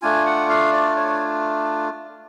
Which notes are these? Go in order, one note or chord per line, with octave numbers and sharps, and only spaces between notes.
A3 D4 F4 G#5
F#5
F5
D5
C#5